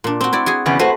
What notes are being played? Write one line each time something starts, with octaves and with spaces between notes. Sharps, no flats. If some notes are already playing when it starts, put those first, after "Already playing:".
A#2 D4
C4 F#4
E4 F#4 D5
F#4 G#4 G#5
E2 C#3 B3
A3 F#4 B4 C5